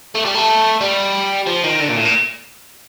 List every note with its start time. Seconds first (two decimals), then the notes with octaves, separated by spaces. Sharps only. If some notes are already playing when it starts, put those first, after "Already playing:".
0.15 A3
0.25 G3
0.35 A3
0.81 G3
1.47 F3
1.64 D#3
1.80 D3
1.89 A#2
1.96 A2
2.05 A#2